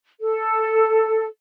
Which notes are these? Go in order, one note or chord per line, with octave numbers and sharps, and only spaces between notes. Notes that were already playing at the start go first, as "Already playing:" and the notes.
A4